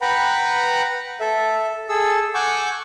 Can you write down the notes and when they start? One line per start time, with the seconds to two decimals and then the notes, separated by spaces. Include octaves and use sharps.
0.02 B4 F#5 G5 A#5 B5
1.20 A4 E5
1.89 G#4 A4 E6
2.35 F#5 G#5 C#6 D6 E6 G6